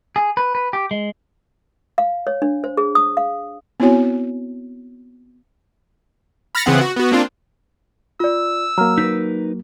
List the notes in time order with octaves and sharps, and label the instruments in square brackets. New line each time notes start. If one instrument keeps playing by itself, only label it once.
[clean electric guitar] G#4
B4
B4
G4
G#3
[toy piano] F5
C#5
D4
C5
G#4
D#6
F5
[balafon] B3 C4 E4 F#4 C#5 G#5
[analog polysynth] B5 F6 A6 A#6 C#7
C#3 E3 B3 C4 F#5
F#4
B3 F#4
A#3 C4 D4 F4
[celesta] F4 D5 [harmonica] E6
[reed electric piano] F#3 A#3 [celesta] A#5 F6
[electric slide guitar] D#4 A#4 B4 [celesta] B6